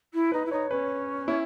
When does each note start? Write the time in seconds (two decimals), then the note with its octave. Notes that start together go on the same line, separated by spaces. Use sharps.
0.13 E4
0.32 D#4 B4
0.45 E4
0.51 D#4 C#5
0.70 C#4 B4
1.28 E4